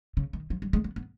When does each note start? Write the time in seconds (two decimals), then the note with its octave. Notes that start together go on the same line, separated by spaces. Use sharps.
0.17 C#3
0.33 D#3
0.50 F3
0.62 G3
0.73 G#3
0.84 B3
0.96 B3